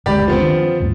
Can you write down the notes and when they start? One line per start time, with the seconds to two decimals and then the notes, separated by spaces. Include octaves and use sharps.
0.06 F#1 D2 G#3 G4 D5 B5
0.28 F3 B3 C4
0.40 D#3 D4
0.80 G1 D#2 G#2